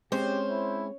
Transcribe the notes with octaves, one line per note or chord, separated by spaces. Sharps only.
G#3 C4 C#4 G4 C5
E4